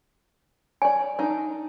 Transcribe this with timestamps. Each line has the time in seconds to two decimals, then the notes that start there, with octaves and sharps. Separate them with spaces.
0.82 C#5 D5 G#5
1.19 D4 D#4